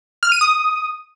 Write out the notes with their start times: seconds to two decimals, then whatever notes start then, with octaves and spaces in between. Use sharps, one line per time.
0.23 F6
0.32 D#7
0.41 D#6